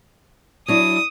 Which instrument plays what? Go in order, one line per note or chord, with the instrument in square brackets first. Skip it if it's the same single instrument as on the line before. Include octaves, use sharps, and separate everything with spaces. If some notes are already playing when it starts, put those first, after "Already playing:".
[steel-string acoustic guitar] F#3 D4 E4 [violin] D#6